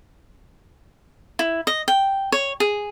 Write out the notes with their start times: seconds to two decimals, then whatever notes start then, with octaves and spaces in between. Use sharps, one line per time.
1.39 E4
1.67 D#5
1.88 G5
2.32 C#5
2.60 G#4